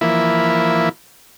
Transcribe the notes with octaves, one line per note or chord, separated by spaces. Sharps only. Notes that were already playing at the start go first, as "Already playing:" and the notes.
E3 F3 A#3 E4 B5